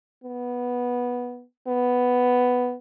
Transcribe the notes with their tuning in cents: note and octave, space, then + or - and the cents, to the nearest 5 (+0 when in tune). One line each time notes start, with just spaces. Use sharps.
B3 -10
B3 +5